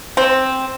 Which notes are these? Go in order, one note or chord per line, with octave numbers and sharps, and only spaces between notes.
C4